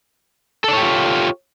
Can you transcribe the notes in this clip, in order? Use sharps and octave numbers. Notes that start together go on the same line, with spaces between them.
F4 G4 A4 C#5 D5